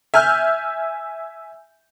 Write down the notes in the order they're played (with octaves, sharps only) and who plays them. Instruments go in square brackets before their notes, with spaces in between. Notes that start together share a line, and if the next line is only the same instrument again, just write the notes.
[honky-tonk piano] E5 G#5 F6 G6